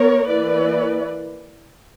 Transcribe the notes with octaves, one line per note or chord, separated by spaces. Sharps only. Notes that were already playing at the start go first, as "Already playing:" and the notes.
Already playing: B3 A#4 C#5
E3 A#3 E4 B4 D5